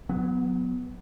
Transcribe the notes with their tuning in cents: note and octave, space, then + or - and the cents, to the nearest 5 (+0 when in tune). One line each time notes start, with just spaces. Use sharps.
F#3 -20 B3 +10